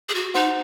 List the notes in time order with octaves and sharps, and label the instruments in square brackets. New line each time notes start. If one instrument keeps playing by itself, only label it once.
[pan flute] G#4
F#4
[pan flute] D#4 [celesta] C5 F#5 C6